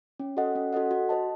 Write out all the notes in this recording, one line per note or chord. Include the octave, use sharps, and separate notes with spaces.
C#4
F#4 A4 D#5 F#5
C#4
F#4 A4 D#5 F#5
F#4
C5 D#5 A5